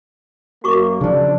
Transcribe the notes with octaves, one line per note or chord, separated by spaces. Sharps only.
F#2 A#3 F#4 C#6 D6
C#3 F3 D4